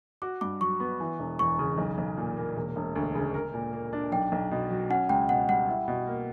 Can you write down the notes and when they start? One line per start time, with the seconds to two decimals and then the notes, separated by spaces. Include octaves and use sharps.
0.22 F#4 D6
0.41 G2 D6
0.61 F#3 C#6
0.80 B3
1.00 E3
1.19 E1
1.39 E2 C#6
1.59 C#3
1.78 B1
1.98 B1
2.17 A#2
2.37 A#3
2.56 E1
2.76 E1
2.96 D2
3.15 C#3
3.34 A#4
3.54 A#2
3.73 A#3
3.93 D4
4.12 B1 G5
4.32 B1
4.51 B2
4.70 F#3
4.90 C#4 F#5
5.09 C#2 G5
5.29 B2 F#5
5.49 G3 F#5
5.68 E4
5.88 B2
6.07 A#3